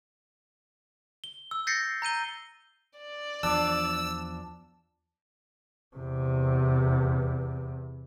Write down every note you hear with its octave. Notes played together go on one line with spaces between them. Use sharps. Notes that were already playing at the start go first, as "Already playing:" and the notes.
G7
E6
G6 A6 A#6 C7 C#7
A#5 G6 D#7 G7
D5
E2 F3 D4 E6
E2 C3